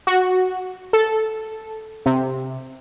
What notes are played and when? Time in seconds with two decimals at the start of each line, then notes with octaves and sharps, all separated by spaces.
0.07 F#4
0.93 A4
2.06 C3